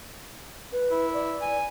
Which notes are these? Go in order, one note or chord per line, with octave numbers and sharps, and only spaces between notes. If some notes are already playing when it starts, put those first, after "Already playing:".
B4
E4
D5
G#5